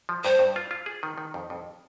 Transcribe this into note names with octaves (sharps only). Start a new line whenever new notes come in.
F3
G2 C5
G2
F4
F4
G#4
D#3
D#3
F2
F2